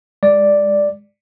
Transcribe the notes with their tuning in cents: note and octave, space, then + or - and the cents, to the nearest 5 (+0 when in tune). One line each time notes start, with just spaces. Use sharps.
G#3 -15 D5 +0